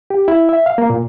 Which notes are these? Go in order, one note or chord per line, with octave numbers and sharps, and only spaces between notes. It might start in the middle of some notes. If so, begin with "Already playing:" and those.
G4
E4
E5
F5
A#3
A#2